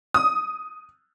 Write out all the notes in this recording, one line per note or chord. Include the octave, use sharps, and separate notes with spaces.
D#6